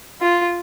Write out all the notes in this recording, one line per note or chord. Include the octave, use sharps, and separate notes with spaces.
F4